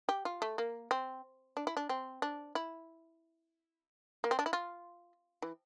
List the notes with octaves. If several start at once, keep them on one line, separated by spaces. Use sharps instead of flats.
G4
F4
A3
A#3
C4
D4
E4
D4
C4
D4
E4
A#3
C4
D4
E4
F4
E3